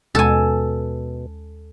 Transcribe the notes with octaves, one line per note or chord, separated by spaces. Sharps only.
D#2 B2 G#3 A4 G#5